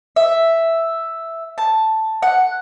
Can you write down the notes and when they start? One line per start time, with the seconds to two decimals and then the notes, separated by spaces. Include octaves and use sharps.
0.16 E5
1.58 A5
2.23 F#5